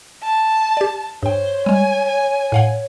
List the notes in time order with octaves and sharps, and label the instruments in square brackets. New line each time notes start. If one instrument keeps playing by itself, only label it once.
[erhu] A5
[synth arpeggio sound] G4 D5
[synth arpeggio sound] G2 G5 [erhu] C5 [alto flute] C#5
[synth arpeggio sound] G3 G#3 [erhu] G#5
[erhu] G#5
[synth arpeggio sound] A2 F5 F#5